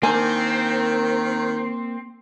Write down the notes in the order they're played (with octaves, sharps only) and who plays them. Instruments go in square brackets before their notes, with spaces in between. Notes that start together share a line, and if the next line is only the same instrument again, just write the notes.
[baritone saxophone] D#3 [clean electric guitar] A#3 [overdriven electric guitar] C4 [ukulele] D4 G#5